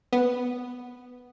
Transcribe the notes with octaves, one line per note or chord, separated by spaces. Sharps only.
B3